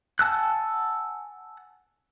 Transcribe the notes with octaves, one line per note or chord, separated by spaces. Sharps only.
F#5 G#5 A5 E6 F#6